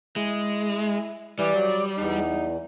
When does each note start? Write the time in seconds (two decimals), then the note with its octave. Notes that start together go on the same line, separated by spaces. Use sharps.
0.16 G#3 E4
1.39 E3 G3 D5
1.55 F#3
1.98 E2 D#4